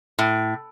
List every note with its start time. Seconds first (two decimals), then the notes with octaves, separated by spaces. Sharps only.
0.19 A2